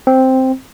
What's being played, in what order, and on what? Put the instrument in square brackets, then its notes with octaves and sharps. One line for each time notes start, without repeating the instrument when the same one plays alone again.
[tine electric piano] C4